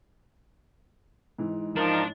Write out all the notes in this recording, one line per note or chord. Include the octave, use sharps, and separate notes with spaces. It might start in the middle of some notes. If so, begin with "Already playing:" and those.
G#2 E3
F3 D4 D#4 A#4